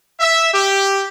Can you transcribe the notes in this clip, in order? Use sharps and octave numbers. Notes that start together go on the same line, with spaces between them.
E5
G4